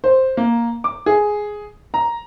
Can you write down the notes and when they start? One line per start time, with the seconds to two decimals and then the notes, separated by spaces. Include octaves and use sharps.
0.04 C5
0.37 A#3
0.84 D6
1.06 G#4
1.94 A#5